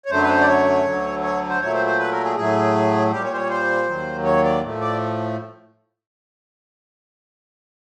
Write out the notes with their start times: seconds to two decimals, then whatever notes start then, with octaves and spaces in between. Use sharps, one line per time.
0.06 C#5
0.11 F#2 D3 F#3 A3 C5
0.23 B4
0.29 C5
0.41 D5
0.48 C#5
0.86 D2 D3 F#3
1.23 C#5
1.49 C5
1.61 A#2 F#3 A3 C#5
1.74 C5
1.86 C5
1.99 B4
2.11 A#4
2.24 G#4
2.36 A2 F#3 A3 G#4
3.11 A#2 G3 G4
3.24 C#5
3.32 C5
3.37 C#5
3.49 C5
3.87 D#2 D#3 F#3
4.24 C#5
4.44 D5
4.62 A2 F3 A3
4.81 D5